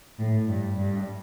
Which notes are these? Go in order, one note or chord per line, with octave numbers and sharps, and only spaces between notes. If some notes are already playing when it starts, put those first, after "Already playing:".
A2
G2
G2